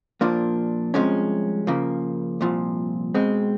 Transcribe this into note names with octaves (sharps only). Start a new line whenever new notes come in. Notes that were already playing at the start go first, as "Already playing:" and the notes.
A#2 F3 A#3 D4
C2 C3 F3 G#3 C#4
C#3 F3 A#3
C2 A#2 F3
B2 G#3 C4